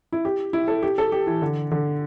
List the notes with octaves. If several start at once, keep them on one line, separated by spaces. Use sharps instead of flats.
E4
G4
E4
A4
G4
A4
G4
E3
D3
D3